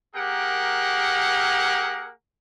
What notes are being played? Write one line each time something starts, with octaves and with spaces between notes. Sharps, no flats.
A#3 G4 G#4 A#4 F#5